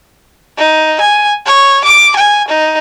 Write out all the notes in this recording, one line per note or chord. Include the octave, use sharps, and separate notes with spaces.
D#4
G#5
C#5
D6
G#5
D#4